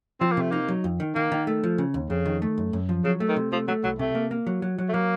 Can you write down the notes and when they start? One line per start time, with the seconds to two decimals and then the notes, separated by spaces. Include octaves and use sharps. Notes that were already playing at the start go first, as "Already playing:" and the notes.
0.21 F3 C4
0.31 A#3
0.37 C3 A3
0.52 A#3 D#4
0.68 F#3
0.84 F2
1.00 D#3
1.15 D#3 A#3
1.32 D#3
1.47 A3
1.64 F3
1.78 C#3
1.94 D#2
2.10 F2 C#3
2.26 D#3
2.42 A3
2.58 F#2
2.73 F#2
2.89 F3
3.04 C#3 F#3
3.20 A3
3.29 D#3
3.36 C3
3.52 F3 A3
3.68 F#3 A3
3.84 C2 F#3
3.99 C3 A3
4.15 A#3
4.31 A#3
4.47 F#3
4.62 F#3
4.78 F#3
4.89 A3
4.94 F#3 A#3